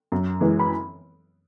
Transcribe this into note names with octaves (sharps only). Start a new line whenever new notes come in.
F#2
E3 G#3
B5